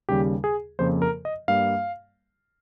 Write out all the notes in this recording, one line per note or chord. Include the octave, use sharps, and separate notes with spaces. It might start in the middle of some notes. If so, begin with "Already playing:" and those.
D#2 C#3 G3 G4
G#4
F2 C#3 F3 A#3 C5
A#4
D#5
G2 G3 A#3 F5